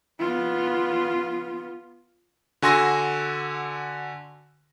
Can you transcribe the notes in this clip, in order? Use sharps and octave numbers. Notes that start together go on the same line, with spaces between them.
B3 F4
D3 F#4 G#5 C6 E6 A#6